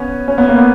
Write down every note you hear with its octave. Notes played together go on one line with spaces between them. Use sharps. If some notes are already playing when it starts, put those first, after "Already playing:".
Already playing: B3 C#4
C#4
B3
A#3
B3